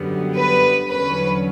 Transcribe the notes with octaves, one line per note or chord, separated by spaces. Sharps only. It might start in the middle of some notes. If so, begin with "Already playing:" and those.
Already playing: F#2 D3 G3 B3
B4
E2 D3 F#3 C#4 B4